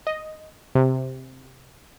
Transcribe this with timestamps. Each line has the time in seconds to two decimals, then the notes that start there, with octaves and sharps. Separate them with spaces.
0.07 D#5
0.75 C3